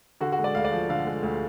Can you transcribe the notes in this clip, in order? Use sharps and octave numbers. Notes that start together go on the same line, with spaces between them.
D3 F#4
F#4
G#3
D5
D2 F5
D5
F3
D3 F5
G#3
D2